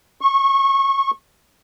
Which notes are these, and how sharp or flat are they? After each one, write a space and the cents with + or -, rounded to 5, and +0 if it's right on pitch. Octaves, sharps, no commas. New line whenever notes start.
C#6 -25